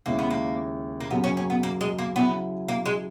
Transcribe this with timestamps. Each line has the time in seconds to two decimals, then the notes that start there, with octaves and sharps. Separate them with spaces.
0.06 D#2 C#3 G#3 A#3 C#4 E4
0.19 B3
0.31 A#3
1.00 A#3
1.11 F#2 C#3 F#3 A#3 B3
1.24 C#4
1.37 C#4
1.50 B3
1.63 A#3
1.81 G#3
1.99 A#3
2.15 C#3 F#3 B3 C#4 E4
2.68 A#3
2.86 G#3